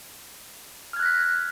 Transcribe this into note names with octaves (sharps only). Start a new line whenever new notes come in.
F6 F#6 G#6 A#6 B6